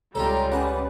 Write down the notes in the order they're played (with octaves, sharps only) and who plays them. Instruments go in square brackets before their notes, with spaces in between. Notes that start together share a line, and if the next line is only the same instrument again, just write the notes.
[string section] C#2 G3 G#3 [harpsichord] F4 G4 A4 [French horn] C#5 [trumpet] A#5
[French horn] C#4 [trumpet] B4 [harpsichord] F#5 A5